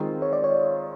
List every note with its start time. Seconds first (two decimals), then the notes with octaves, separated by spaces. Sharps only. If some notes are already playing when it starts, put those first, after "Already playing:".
Already playing: D#3 G#3 C4 F4
0.22 C#5
0.33 D5
0.44 C#5